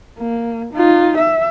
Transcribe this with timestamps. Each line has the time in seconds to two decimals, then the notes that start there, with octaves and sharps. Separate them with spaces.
0.19 A#3
0.74 D#4 F4
1.18 E5